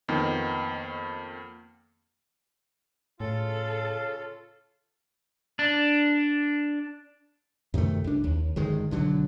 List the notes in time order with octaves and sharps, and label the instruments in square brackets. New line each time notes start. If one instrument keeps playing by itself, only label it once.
[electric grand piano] F2 D#3 A#3 B3
[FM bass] A2 [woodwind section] C#3 F4 [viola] A4
[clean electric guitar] D4
[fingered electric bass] F#2 C3 D#3 A3
C2 D4
D#2
G1 D#3 G#3
B1 D3 F3 F#3